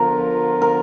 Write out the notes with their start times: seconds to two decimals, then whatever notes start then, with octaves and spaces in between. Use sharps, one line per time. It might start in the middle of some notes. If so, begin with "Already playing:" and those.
Already playing: D3 F3 B3 F4 A#4
0.62 A#4